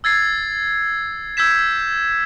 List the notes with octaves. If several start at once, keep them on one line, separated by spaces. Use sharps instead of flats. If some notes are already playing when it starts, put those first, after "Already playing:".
E6 G#6 A6 C7
E6 G6 G#6 B6 E7